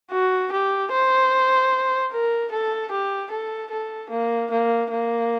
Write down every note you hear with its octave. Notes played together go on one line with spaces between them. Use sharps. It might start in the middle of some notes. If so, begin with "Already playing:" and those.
F#4
G4
C5
A#4
A4
G4
A4
A4
A#3
A#3
A#3